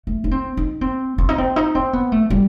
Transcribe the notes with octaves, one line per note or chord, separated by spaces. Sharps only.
A3
D#4
C4
D#4
C4
C4
D#4
C4
D#4
C4
B3
A3
G3